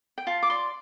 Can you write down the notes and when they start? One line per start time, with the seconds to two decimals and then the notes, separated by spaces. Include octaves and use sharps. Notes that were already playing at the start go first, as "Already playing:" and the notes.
0.18 G5
0.27 F4 A5
0.43 D6
0.50 D5 C6